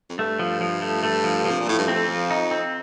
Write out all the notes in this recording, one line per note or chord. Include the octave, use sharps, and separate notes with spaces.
F2
G2 A3
F3
F3
A3
A3
F3
F3
C3
A#2
A2 A3
G2
F2 C4
F3
D#4
C4